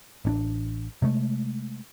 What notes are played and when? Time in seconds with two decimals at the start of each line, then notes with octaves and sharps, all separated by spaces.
0.25 A1 C#4 D4
1.02 C3 G#3 A3